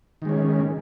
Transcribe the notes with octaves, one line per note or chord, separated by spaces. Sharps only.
D#3 G#3 C#4